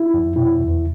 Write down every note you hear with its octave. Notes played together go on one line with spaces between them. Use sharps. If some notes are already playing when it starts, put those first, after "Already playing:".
Already playing: E4
F2
B2 E4
E2